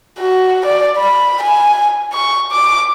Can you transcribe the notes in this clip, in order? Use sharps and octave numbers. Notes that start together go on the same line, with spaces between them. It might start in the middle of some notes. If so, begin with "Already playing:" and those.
F#4
D5
B5
G#5
C#6
D6